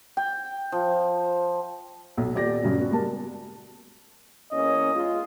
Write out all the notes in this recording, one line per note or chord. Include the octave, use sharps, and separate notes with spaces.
G5
F3
B1
D#1 G4 D5 A#6
G2 C#3 F#3
B3 F#4
G3 G#3 A#4 A5
E2 A#3 C#4 D#5
G#3 F4